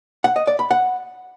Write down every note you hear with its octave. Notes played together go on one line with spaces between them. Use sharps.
F#5
D#5
D5
B5
F#5